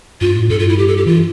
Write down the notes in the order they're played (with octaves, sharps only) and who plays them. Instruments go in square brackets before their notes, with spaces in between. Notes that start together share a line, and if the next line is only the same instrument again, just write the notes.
[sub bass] G2 [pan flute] F4
[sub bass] A2
[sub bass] G2 [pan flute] A4
[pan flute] F4
E4
G4
A4
G4
[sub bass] E3 [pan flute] F4